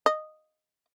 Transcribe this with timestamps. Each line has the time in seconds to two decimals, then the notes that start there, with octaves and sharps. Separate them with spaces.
0.06 D#5